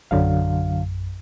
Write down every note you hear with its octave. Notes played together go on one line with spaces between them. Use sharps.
A#1 F#2 D3 F#3 F5